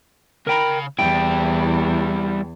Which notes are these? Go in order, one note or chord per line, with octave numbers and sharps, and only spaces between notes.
C#3 A#4 G5 A#5 B5
E2 G3 E4 G5